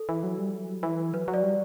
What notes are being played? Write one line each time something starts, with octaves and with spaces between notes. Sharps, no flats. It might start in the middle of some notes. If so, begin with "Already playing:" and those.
Already playing: A4
E3
F#3
G3
F#3
E3
F#3 B4
F#3
D5
G3